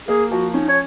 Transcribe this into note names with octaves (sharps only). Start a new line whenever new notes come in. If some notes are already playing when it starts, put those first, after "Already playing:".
A#3 G#4
F3 F#4
C#4 D#4
C#5